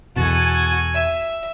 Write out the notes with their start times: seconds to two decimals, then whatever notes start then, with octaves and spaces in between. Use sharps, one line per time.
0.16 E2 B2 F#4 A4 G#5
0.95 E5